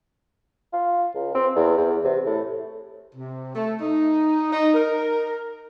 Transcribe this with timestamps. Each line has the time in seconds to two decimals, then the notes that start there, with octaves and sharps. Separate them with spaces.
0.73 F4
1.15 C#2
1.35 C4
1.56 E2
1.77 E2
2.04 C3
2.26 A2
3.15 C3
3.55 A3
3.80 D#4
4.52 D#4
4.74 A#4